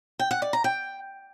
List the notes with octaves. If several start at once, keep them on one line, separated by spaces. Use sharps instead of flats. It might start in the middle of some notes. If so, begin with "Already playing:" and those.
G5
F#5
D5
A#5
G5